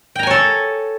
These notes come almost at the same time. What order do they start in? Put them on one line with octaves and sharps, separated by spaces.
G5 A#5 G#5 C#5 A4